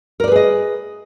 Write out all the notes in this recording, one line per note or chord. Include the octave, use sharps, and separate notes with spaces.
G#4 A#4 B4 D5 D#5